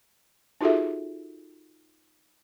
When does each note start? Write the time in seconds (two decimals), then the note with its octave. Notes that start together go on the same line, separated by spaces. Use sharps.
0.61 D#4 F4 F#4 G#4 A4 E5